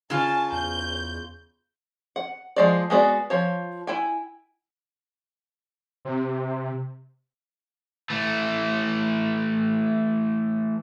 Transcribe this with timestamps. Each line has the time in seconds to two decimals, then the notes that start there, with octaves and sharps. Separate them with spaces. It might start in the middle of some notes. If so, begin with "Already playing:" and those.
0.10 C#3 F4 G#5 A5
0.52 E2 G6
2.16 F#5
2.56 F3 G#3 D5
2.90 G#3 B3 F#4 D5
3.30 F3 C#5
3.87 E4 G5 G#5
6.05 C3
8.10 E3 A3